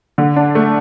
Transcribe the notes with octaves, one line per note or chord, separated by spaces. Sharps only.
D3
D4
A3